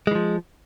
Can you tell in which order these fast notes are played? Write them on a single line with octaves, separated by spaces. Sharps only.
G#3 E3 F3